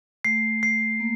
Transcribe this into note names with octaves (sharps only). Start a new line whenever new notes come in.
A3 C7
C7
A#3